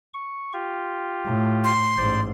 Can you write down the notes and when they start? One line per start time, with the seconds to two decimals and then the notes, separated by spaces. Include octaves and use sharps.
0.14 C#6
0.53 F4 G4
1.26 A2
1.64 C6
1.97 A1 G#2 C5 D5